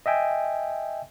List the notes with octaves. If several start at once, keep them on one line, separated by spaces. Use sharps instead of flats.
D#5 E5 G5 G#5